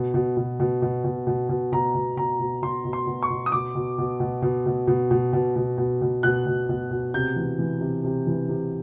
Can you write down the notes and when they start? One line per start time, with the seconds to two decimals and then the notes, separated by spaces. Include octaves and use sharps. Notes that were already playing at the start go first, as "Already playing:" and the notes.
Already playing: B2
0.14 B2
0.37 B2
0.60 B2
0.82 B2
1.04 B2
1.27 B2
1.49 B2
1.72 B2 A#5
1.95 B2
2.17 B2 A#5
2.39 B2
2.62 B2 C6
2.85 B2
2.93 C6
3.07 B2
3.23 C#6
3.30 B2
3.46 D#6
3.52 B2 D6
3.75 B2
3.98 B2
4.20 B2
4.42 B2
4.66 B2
4.87 B2
5.11 B2
5.33 B2
5.56 B2
5.78 B2
6.01 B2
6.23 B2 F#6
6.46 B2
6.69 B2
6.91 B2
7.14 C3 G6
7.36 E3
7.59 E3
7.81 C3
8.04 C3
8.27 E3
8.49 C3